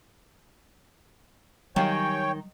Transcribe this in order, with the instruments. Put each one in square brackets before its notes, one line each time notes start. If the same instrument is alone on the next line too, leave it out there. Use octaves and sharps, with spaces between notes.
[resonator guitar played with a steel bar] D#3 [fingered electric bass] F#3 G3 [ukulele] G4 F5 G#5 [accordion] C#5 G5